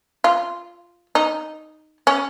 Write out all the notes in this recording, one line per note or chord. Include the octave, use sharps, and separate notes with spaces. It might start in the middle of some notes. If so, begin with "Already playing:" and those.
F4
D#4
C#4